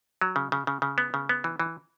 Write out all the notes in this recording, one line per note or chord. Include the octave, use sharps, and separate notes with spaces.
F#3
C#3
C#3
C#3
C#3
B3
C#3
B3
E3
E3